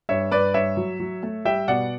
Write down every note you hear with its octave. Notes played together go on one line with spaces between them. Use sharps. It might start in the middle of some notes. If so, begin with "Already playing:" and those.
G2 C#5 E5
G2 B4 D5
G2 C#5 E5
F#3
F#3
A3
G3 E5 G5
B2 D5 F#5